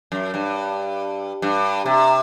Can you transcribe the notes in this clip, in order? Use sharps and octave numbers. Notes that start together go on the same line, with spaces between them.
F#2
G2
G2
C3